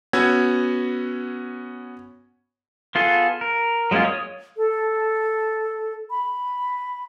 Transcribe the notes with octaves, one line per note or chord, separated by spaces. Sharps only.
B3 C#4 F#4 E6 G#6
B3 F4 G#4 A4
A#4
F#3 G#3 A#3 C#4 F4
C#5 D#6
A4
B5